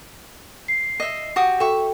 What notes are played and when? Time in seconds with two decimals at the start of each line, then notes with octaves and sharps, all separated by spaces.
0.68 C7
1.00 D#5 E5
1.36 F#4 G4 D#6
1.60 F#4 A4 E5 G5 C#6